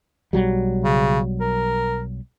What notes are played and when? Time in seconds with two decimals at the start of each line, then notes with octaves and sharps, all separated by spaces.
0.33 B1 F#3 G3
0.84 C#3
1.41 A#4